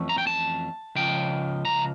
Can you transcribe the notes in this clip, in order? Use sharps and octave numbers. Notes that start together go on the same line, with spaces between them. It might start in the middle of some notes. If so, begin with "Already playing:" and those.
Already playing: F2 E3 A3 C#4
A#5
G5
A5
C#2 C#3 F3 G5
A#5